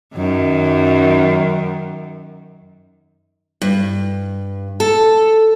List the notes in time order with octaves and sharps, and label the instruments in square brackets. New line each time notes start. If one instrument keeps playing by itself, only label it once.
[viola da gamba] F#2 D#3
[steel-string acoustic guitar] G2
A4